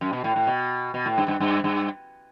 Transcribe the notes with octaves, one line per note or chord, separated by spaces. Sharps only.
F#2
B2
A2
A2
B2
B2
A2
G2
G2
G2
G2